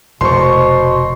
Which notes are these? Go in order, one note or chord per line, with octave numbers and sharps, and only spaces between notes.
F1 B2 A#4 C5 D5 C6 C#6